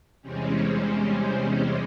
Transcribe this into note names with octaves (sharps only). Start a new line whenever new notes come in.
E2 C3 G3 G#3 C4 C#4